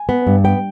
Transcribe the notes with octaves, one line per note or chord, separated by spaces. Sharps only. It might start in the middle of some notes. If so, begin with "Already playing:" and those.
Already playing: G#5
B3
G2
B3 G5